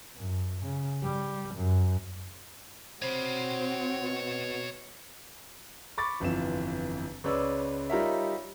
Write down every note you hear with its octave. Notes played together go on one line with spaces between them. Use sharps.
F#2
C#3
G3
F#2
C4 F#4 C5 C#5 B5
B2
B5 C#6 D6 A6
G1 F2 E3 F4 E7
C#2 B4 C#5 D5 E6
G3 D#4 F4 A#4 C#5 E5